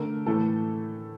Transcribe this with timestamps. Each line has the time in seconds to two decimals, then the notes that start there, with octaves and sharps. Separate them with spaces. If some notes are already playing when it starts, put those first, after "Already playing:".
Already playing: D3 A3 A#4
0.26 A2 E3 A3 A4